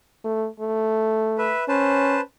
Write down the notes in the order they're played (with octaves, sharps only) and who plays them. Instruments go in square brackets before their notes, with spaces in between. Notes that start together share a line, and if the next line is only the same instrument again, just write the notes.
[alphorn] A3
A3
[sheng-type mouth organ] B4 E5
[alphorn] C#4 [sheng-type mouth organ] B4 C5 A5